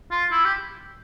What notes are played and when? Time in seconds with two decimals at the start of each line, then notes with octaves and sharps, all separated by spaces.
0.11 F4
0.32 E4
0.45 G4